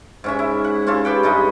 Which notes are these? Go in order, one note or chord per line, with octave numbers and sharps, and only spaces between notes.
G#2 C#4 E5
E4
F#5
C4 C#4 F4 A4
E4 G4 B4 G5
G2 G#3 D#4 D#5